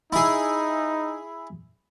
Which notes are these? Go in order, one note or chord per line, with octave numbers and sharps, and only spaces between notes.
D#4 E4 G#4